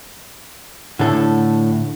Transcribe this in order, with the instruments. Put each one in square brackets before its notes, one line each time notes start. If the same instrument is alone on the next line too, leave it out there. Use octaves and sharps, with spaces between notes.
[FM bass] A2 [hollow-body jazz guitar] D3 A4